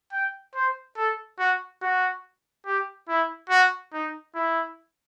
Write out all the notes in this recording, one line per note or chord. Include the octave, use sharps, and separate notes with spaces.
G5
C5
A4
F#4
F#4
G4
E4
F#4
D#4
E4